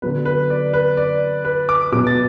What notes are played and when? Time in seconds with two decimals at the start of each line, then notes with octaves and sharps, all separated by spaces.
0.02 D3 F#3 B3 B4
0.25 B4
0.50 D5
0.73 B4
0.97 D5
1.45 B4
1.69 D6
1.92 B2 F#3 B3 D6
2.07 A6